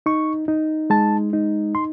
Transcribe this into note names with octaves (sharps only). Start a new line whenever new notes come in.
D#4 C#6
D#4
G#3 A5
D#4
C6